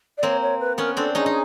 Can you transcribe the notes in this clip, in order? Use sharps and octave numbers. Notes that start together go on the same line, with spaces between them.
D5
A#3 C4 C#5
C#5
B4
B3 C#4 A#4
C4 D4 A4
C#4 D#4 G#4
D#4